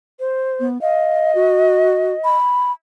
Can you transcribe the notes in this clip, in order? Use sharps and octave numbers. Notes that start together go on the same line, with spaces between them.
C5
B3
D#5 F5
F#4
B5